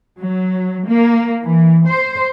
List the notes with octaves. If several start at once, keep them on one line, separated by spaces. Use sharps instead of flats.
F#3
A#3
E3
C5